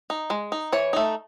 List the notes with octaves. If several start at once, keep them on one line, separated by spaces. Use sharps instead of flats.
D#4
G#3
D#4
E3 C#5
A3 D#4